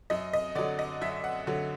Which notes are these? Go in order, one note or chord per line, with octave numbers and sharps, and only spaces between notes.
F#2 D#5
D#5
D3 F#3 D5
D#5
F#2 E5
F#5
D3 F#3